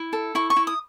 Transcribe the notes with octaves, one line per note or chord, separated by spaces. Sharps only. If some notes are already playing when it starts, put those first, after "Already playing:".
Already playing: E4
A4
E4 C#6
C#6
E4
D#6